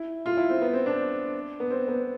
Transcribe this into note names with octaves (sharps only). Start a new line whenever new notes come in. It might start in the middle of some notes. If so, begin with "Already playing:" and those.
Already playing: E4
F4
E4
C4
B3
C4
D4
B3
C4
B3